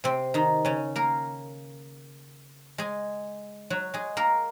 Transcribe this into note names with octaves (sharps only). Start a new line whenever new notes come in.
C3 C4
D#3 D#4
C#3 C#4
A#3 A#4
G#3 G#4
F#3 F#4
G#3 G#4
A#3 A#4